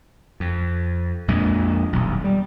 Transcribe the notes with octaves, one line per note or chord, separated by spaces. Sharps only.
F2
A#1 F2 A#2 G#3
D#1 B1
G3